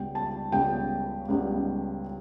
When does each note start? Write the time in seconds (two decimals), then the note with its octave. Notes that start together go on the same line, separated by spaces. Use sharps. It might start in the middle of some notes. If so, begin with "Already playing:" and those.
Already playing: C#2 C#3 G3 B3 G5
0.15 A5
0.52 C#2 C#3 G3 B3 G5
1.28 C#2 C#3 G3 B3